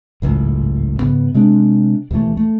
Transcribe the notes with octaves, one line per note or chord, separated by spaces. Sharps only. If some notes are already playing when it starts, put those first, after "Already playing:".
G#1 C#2 F#2 A2
G#2 C#3 B3
C3 G#3 C4 D4
D#2 B2 E3 A3
A3